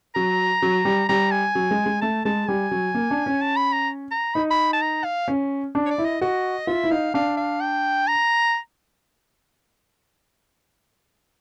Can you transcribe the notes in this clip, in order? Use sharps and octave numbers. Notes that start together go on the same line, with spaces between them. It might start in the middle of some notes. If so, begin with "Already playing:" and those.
F#3 A#5
F#3
G3
G3 A#5
G#5
F#3
G#3
G#3
A3 A5
G#3 A5
G3 G#5
F#3
A#3
D4
C#4
A5
B5
A#5
A#5
D#4 B5
B5
A5
A#5
F5
C#4
D4
C#5
D5
E4
D#5
F#4 D#5
F4 E5
E4
D#4 F5
D4 F5
F5
G5
A#5